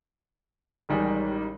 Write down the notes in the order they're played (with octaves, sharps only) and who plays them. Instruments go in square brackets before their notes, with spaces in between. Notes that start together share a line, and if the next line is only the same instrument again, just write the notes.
[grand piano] A1 D#3 G3 G#3